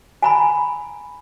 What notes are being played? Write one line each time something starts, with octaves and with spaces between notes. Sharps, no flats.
G#5 A#5 B5